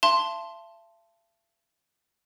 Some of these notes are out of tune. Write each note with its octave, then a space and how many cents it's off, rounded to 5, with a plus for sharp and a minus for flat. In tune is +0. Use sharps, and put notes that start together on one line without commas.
E5 +45 A5 +0 C6 +0